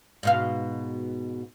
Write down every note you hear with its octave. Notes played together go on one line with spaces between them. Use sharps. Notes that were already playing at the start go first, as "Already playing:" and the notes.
G#2 B2 F5